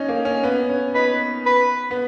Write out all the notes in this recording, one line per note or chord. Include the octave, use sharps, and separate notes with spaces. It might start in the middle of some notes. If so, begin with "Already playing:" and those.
Already playing: C#4 D#4
A#3
C#4
B3
C#4
D#4 B4
B4
B3